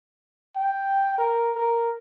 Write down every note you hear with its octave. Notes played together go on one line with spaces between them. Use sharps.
G5
A#4
A#4